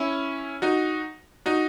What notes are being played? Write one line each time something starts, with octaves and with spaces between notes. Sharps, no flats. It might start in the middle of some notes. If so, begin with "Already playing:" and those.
Already playing: C#4 E4
D#4 F#4
D#4 F#4